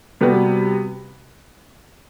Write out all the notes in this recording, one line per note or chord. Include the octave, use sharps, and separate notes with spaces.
C3 G3 B3 F#4 B4